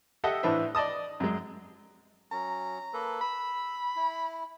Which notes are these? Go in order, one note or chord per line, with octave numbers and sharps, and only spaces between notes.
G4 A4 D#5 E5 F#5
A2 E3 D4 B4 C5 E5
D5 D#5 A5 D#6
F#2 G#3
F#3 C#4 A#5
A#3 A4 B4
B5 E6
E4